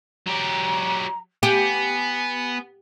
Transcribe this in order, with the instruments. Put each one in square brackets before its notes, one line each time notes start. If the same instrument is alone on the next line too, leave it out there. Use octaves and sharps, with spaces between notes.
[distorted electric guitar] F#3 G4 [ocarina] A#5
[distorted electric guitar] B3 [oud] G4 [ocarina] G#5